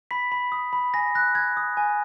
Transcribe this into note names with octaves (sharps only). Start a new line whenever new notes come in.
B5 B6
B5
D#6
B5
G#5 A#6
F#6 A#6
F#6 G#6
D#6
G#5